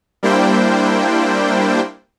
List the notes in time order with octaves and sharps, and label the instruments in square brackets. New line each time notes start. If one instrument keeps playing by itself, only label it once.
[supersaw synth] G3 A#3 D4 E4 C5 G5